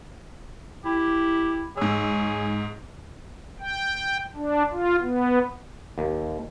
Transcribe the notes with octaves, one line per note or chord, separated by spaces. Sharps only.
E4 G4
G#2 G#4 C#5 E6
G5
D4
F4
B3
D#2